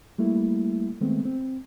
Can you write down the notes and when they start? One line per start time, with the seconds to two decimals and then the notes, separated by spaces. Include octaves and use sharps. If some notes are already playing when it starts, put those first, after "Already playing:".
0.18 G3 A3 A#3 E4
1.01 D#3 G#3 A3 B3 C4
1.25 C4